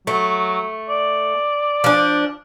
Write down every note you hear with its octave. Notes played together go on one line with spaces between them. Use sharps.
F#3 A3
D5
F3 D4